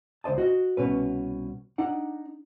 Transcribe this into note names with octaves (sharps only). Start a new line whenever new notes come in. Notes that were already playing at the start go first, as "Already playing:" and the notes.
C#2 D4 C5 D#5 A5
F#4 D#5
C2 B2 C#4 B4
D4 D#4 F#5